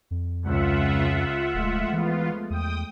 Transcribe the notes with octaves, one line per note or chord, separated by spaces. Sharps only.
F2
C#2 C#3 F4 E5 F#5
D#1 F3 G#3 A3
E3 B3 F4
E2 G5 D#6